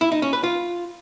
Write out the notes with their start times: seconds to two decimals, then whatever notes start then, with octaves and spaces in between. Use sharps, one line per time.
0.01 E4
0.12 D#4
0.22 C#4
0.33 B4
0.44 F4